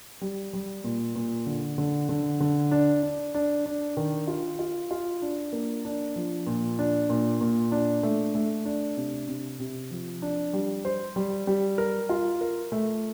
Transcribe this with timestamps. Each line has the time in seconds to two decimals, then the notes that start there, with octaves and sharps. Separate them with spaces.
0.21 G3
0.53 G3
0.84 A#2
1.16 A#2
1.46 D3
1.78 D3
2.09 D3
2.40 D3
2.71 D4
3.03 D4
3.34 D4
3.66 D4
3.97 D#3
4.27 F4
4.59 F4
4.91 F4
5.22 D4
5.53 A#3
5.85 D4
6.16 F3
6.47 A#2
6.79 D4
7.09 A#2
7.41 A#2
7.72 D4
8.03 A3
8.35 A3
8.65 D4
8.97 C3
9.28 C3
9.59 C3
9.91 F3
10.22 D4
10.53 G3
10.85 C5
11.16 G3
11.47 G3
11.78 A#4
12.09 F4
12.41 A#4
12.72 A3